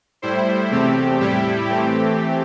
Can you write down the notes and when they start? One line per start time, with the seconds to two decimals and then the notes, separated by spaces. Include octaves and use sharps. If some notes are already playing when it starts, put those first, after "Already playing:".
0.22 A2 G3 E4 C5
0.71 E2 C3 A3 C4 G4
1.20 A2 G3 E4 G4
1.69 E3 A3 C4 G4